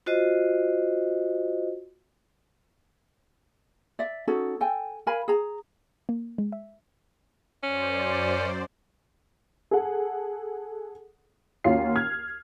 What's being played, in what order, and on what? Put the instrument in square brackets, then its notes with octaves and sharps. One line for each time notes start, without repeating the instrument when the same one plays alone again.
[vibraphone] F4 F#4 C5 D#5
[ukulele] D5 E5
C#4 D#4 F#4 A4
A4 G5 G#5
A#4 F5 G#5 B5
G#4 A#5
[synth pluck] A#3
G#3
E5
[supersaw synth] F#2 C5 D5 [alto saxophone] C#4
[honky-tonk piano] G#4 A4 F#5
D#2 C#4 F4 F#4 F5 C7
F6 G#6